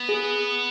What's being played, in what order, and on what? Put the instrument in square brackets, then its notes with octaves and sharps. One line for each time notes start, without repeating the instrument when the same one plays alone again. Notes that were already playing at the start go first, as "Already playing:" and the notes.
Already playing: [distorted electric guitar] B3
[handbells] G#4